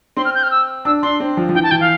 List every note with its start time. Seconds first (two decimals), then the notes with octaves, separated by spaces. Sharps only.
0.17 C4 C6
0.25 F6
0.35 G6
0.43 F6
0.51 E6
0.85 D4 E6
1.02 D4 C6
1.20 C4
1.37 F3
1.49 F3
1.54 E3 G5
1.63 A5
1.71 E3 G5
1.80 F5